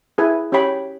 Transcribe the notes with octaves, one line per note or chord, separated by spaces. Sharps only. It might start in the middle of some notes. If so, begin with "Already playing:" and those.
E4 G#4 B4 E5 G#5
C#4 G4 C#5 G5 B5